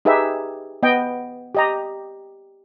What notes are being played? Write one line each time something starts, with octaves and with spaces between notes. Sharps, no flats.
D#4 G4 G#4 B4 E5
B3 D#5 G5
G4 D#5 A#5